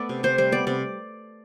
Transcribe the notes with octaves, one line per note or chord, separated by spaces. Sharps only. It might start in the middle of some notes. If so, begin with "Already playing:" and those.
Already playing: A3 B3 D5 E5
C3
C3 C5
G3 C5
B3 D5
C3 D5